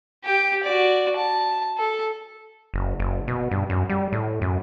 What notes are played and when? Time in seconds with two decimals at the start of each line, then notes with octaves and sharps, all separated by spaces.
0.24 G4 G5
0.63 F#4 D5
1.16 A5
1.78 A4
2.74 F#1
3.00 F#1
3.28 B2
3.51 G2
3.70 F#2
3.89 G3
4.12 A2
4.42 F#2